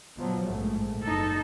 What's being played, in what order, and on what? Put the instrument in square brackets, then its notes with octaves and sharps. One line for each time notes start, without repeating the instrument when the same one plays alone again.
[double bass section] B2 F3 F#3
A#1 G#2 A3
[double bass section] F#1 [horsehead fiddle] D#4 A4